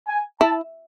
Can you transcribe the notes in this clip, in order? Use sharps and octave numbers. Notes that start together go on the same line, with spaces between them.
G#5
E4 A5